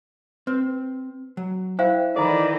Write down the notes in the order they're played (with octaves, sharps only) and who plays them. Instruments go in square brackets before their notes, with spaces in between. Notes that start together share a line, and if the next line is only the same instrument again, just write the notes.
[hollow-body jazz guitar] C4 [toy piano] B4
[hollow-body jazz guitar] F#3
[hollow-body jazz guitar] E4 E5 [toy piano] C5 F5 G5
[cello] D#3 E3 [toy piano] A4 A#5 B5 [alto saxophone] D5